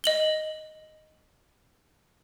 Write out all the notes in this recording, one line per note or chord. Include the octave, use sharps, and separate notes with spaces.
D#5 F#7 G7